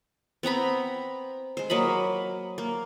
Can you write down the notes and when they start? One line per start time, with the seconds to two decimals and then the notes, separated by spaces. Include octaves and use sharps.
0.43 B3 C4 A#5 B5
1.57 G#3 C5
1.70 F#3 A#3 D#5 B5
2.58 A#3